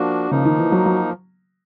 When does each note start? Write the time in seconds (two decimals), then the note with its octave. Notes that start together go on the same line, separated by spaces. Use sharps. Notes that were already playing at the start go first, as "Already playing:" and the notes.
Already playing: F3 A#3 D4 F#4
0.31 C#3 F3 A#3 D#4
0.45 D#3
0.58 E3
0.72 F#3
0.86 F#3